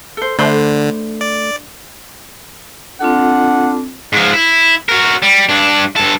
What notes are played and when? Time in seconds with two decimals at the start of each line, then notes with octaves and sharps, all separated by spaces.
0.17 A4 C5
0.39 D3 A3 D4 C5 B5
1.21 D5
3.00 C4 D4 F4 A4 F#5
4.13 G#2 F3
4.33 E4
4.89 F#4 A#4
5.22 G3
5.49 G2 D4
5.96 G2 A4